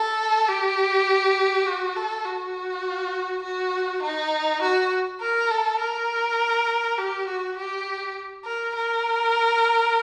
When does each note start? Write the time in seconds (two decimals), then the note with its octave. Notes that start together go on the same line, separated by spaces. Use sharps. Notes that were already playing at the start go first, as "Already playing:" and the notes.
Already playing: A4
0.49 G4
1.67 F#4
1.97 A4
2.25 F#4
3.43 F#4
4.03 D#4
4.62 F#4
5.21 A#4
5.51 A4
5.80 A#4
6.98 G4
7.28 F#4
7.57 G4
8.46 A#4
8.76 A#4